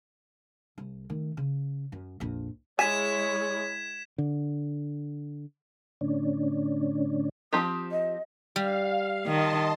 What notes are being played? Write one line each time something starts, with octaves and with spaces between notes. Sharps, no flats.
C2
D#3 A3
C#3
F#2
A#1 F2
G#3 E4 C#5 G#5 G#6 B6 E7
D3
A2 D3 C#4 D4
F3 C4 G4 D#6
D#5
G3 F5
D#3 D#5 A5 C6